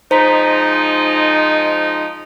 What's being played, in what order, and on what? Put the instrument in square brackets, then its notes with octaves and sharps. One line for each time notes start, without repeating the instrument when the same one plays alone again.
[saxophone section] F3 G#3 D#4 [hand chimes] C5 A#5 B6